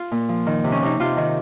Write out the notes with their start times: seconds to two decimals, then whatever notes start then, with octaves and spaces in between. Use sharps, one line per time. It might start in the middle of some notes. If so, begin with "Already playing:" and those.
Already playing: F4
0.11 A#2
0.29 F3
0.46 D#3
0.64 C3
0.72 C#4
0.82 C3 D#4
1.00 C3 F4
1.17 D#3